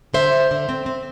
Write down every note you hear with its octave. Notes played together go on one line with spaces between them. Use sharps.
D3 C5 E5
D3
D3
C4
C4